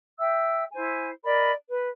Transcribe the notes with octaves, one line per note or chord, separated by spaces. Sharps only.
E5 G5 E6
E4 C5 G#5
A#4 D5 D#5 B5
B4